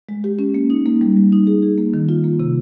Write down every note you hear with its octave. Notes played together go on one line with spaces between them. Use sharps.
G#3
G4
C#4
A#3
D#4
A#3
G3
G3
D#4
G#4
G#4
A#3
D#3
F4
A#3
C3